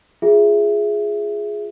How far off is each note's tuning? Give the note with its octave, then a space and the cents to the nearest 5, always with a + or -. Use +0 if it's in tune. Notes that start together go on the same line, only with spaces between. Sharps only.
F4 +0 G#4 +0 E5 +10